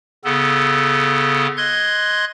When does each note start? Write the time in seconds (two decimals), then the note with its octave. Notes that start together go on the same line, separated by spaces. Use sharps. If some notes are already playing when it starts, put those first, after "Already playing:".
0.25 C#3 B3 A4
1.57 D#5 C6 F#6 G#6